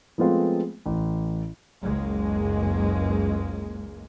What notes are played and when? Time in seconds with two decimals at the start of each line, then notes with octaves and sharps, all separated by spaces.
0.18 F3 G#3 A3 B3 C4 F4
0.86 A1
1.82 F#1 C#2 G#3 A#3